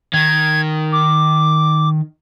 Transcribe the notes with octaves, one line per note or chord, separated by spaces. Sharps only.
D#3 G#6
D6